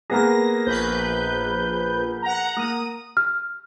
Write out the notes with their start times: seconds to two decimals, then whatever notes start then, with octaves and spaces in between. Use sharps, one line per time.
0.10 A#3 B3 G#4 A#6
0.66 A#1 B4 G6
2.22 F#5 A#5
2.57 A#3 D#6
3.17 F6